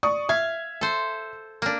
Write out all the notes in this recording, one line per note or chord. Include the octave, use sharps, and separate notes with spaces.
D5 C#6 D#6
E5 F5 G#6
A4 C5
A#3 D4